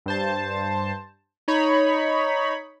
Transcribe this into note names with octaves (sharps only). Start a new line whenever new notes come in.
G2 C5 A5
D#4 C#5 B5